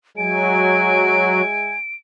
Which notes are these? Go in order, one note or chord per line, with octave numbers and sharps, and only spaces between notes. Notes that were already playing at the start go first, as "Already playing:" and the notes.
F#3 G#3 E5 G#5 D7